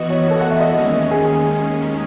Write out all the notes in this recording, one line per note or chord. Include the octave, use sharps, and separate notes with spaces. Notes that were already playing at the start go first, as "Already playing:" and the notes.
Already playing: E3 B3 F#4 D#5
C#5
A4
F#5
E5
D#5
D#2 D#3 G#3 C#4
G#4